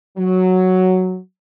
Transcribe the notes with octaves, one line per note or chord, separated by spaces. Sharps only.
F#3